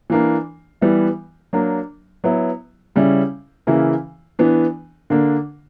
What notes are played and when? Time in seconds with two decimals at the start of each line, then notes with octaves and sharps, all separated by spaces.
0.10 E3 A#3 D4
0.81 E3 G3 B3 E4
1.53 F#3 A#3 D4
2.24 F#3 B3 E4
2.95 C#3 G3 C#4 E4
3.67 C#3 E3 A#3 E4
4.39 E3 B3 D4
5.10 D3 A#3 D4